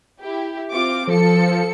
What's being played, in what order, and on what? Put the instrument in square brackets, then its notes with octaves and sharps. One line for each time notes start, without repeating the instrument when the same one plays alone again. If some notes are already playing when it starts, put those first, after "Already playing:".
[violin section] E4 G4
C4 F4 D6
[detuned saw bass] F3 [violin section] A4 C#7